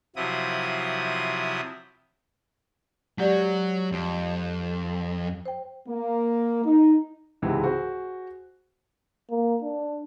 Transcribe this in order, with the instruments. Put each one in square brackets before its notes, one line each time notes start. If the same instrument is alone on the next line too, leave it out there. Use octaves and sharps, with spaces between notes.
[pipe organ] C3 F3 F#3 E4 D#6
[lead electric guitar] F#3 F#4 [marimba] G#3 G4 D5
[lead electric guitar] F2
[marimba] C5 G5
[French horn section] A#3
D#4
[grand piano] C#2 G#2 C3 E3 G#3
F#4 G#4 C5
[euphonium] A#3
D4